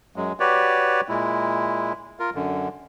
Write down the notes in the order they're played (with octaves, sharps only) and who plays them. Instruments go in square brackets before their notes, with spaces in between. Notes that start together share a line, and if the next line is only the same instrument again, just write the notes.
[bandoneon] F#2 F#3 G#3
F#4 G4 B4 C#5 D5
A#2 G#3 E4
F4 A#4
F#2 D3